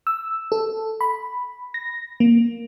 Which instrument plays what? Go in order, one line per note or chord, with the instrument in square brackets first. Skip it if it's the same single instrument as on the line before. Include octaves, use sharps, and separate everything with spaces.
[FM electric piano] E6
A4
B5
A#6
A#3